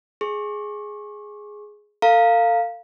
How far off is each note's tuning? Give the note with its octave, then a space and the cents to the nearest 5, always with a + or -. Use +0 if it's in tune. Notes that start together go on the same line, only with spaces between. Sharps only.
G#4 +5 C#6 -30
A4 +40 F5 +0 A#5 -20